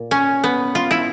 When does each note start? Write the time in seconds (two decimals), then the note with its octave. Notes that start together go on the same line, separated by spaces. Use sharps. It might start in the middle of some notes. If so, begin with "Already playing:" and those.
Already playing: A#2
0.11 C#4
0.44 B3
0.75 F4
0.91 E4